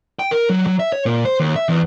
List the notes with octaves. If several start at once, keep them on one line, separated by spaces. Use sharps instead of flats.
G5
A#4
F#3
F#3
E5
C#5
A#2
C5
D#2
E5
E2